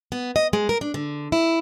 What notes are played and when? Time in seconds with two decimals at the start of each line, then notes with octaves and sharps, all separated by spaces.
0.12 B3
0.36 D#5
0.53 G#3
0.69 A#4
0.81 D4
0.94 D3
1.32 E4